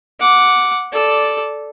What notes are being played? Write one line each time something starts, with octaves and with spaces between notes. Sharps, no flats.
F#5 D6
A4 D5